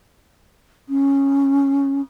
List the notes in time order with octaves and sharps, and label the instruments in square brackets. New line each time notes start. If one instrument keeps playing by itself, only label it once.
[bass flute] C#4